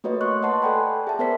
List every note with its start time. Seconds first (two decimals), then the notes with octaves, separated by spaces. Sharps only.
0.04 A3 A#3 F#4 B4 C#5 D#5
0.21 C6 C#6 F#6
0.43 D#5 F#5 A5 C6
0.62 A4 D5 G5 G#5 B5
1.07 G#4 E5 A5
1.19 B3 G#4 A#4 C5 D5 B6